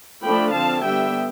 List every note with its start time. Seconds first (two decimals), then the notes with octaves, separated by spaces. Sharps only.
0.23 F3 A3 D4 G5 B5
0.53 D3 F3 C4 F5 A5
0.83 D3 G3 B3 E5 G5